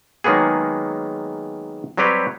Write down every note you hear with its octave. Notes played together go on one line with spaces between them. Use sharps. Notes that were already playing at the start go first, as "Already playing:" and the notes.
D#3 F#3 G#3 A#3 B3 G#4
F#3 G3 C4 G4 B4 C#5